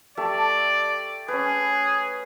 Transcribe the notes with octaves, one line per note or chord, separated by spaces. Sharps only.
A3 G4 D5 E5
C#4 G#4 B4